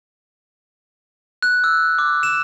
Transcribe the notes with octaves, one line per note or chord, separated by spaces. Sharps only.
F#6
E6
D6
E7